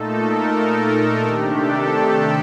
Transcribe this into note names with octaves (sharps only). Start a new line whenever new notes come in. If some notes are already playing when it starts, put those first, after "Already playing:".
Already playing: A#2 A3 D#4 A4
A#4
C3 D#3 A3 D4 G4
A4